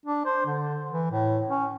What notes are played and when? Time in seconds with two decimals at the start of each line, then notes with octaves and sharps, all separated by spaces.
0.06 D4
0.25 C5
0.46 D3
0.91 E3
1.11 A2
1.48 C#4